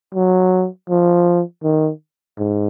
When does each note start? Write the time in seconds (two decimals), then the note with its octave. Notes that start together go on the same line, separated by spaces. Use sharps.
0.15 F#3
0.89 F3
1.64 D#3
2.39 G#2